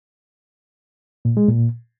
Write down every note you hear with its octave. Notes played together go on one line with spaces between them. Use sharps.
A#2
G#3
A#2